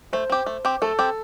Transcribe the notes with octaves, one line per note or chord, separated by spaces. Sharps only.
A3 C5
C4 G4
A3
C4 G4
A3 A4
C4 G4